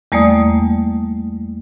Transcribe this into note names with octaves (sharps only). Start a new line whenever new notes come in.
E2 G3 A3 A#3 D5 D#6